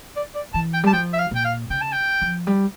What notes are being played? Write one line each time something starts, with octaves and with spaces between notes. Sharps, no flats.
D5
D5
E3 A5
G5
G3 A5
F3 G5
E5
F5
A#2 G5
F5
C#3 G5
A5
G5
F3
G3